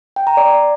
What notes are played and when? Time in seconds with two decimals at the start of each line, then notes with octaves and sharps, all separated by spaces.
0.16 G5
0.27 A#5
0.37 D5